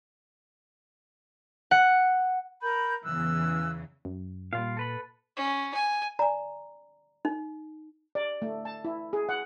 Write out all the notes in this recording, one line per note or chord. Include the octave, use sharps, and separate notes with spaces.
F#5
A#4 B5 G6
E2 C#3 E3 E6 F#6
F#2
A#2 G3 F4 F5
A4 B4 B5
C#4
G#5
D5 G#5 A#5
D#4
D5
A3
A5
E4
G#4
F#5